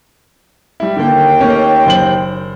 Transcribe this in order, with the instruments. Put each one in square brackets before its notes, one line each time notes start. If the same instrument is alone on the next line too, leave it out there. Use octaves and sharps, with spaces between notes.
[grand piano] G3 E4
[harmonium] D#2 G5 [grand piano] D3 A#3
[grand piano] A3 A#3 C#4
F#1 C5 F#7